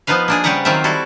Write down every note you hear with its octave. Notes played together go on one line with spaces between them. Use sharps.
F3 B3 D#4 B4 F5
A#3 D4 G#4
C#3 G3 G4 B4 F#5 A#5
D#3 F#3 C4 F4 E5
G3 E4 F#4 A4